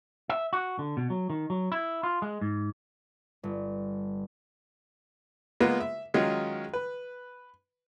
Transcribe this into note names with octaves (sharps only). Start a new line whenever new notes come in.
E5
F#4
D3
B2
F#3
D#3
F#3
E4
F4
G#3
G#2
G1
G#3 A#3 B3 F4 B4
E5
D#3 F#3 G#3 C#4 D#4 F4
B4